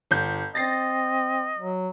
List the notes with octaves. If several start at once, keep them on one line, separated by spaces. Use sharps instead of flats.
G1 G6
C4 D#5 A6 A#6 C7
F#3